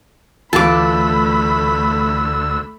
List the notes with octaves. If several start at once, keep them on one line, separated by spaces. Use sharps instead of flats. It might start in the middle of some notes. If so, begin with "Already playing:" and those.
D2 E3 A3 F4 A5 B5 D6 E6